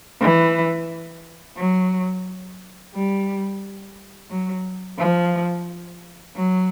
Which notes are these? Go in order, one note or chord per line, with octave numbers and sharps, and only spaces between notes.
E3
F#3
G3
F#3
F3
F#3